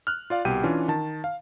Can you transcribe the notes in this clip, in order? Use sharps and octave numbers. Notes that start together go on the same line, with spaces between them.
F6 F#6
F4 D5 F5
C2 B2 G4 G5 D#7
E3 C#4 D4 F4
D#3 A5
F5